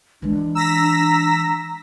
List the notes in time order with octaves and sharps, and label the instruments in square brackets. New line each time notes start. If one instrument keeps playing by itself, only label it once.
[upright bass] E3 G#3 [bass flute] D4
[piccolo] A#5 [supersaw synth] E6 A#6 B6